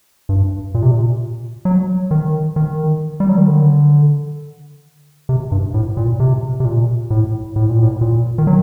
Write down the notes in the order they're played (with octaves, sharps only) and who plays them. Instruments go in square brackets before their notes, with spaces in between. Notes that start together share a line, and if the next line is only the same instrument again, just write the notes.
[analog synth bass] G2
A#2
C3
A#2
F#3
D#3
D#3
G3
F#3
D#3
D3
C3
G2
A2
A#2
C3
C3
A#2
A2
A2
A#2
A2
A#2
D#3
F#3